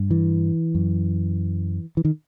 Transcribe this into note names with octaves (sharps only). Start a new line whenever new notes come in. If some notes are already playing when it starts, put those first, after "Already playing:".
Already playing: G2
E3
F#2
E3
D#3